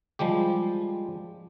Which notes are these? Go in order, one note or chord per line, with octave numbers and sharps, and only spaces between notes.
F3 G3 G#3 G4